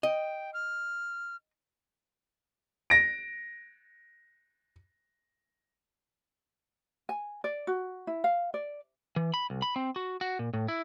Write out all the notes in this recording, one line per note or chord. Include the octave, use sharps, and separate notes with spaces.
D#5 G5
F6
A#6 D7
G#5
D5
F#4
E4
F5
D5
E3
B5
C2
B5
C4
F#4
F#4
A#2
A2
E4